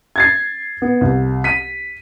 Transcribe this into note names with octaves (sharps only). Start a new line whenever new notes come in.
G#6 A6 C7
B3
C2
B6 D#7